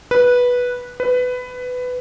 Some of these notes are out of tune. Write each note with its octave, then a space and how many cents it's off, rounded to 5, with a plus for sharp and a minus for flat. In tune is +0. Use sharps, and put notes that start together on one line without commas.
B4 -10
B4 +15